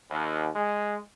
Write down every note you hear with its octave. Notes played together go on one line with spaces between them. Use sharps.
D#2
G#3